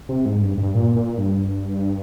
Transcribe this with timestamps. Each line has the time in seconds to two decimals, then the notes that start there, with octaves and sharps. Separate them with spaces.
0.09 C3
0.25 G#2
0.42 G2
0.58 G2
0.75 A#2
0.96 A#2
1.18 G2